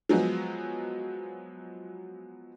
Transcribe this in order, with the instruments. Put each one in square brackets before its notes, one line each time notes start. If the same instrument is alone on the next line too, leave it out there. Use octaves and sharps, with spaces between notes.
[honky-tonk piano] F3 F#3 G#3 B3